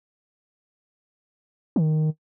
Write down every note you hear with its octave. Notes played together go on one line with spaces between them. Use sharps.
D#3